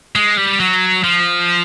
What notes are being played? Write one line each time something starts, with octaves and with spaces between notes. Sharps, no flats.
G#3
G3
F#3
F3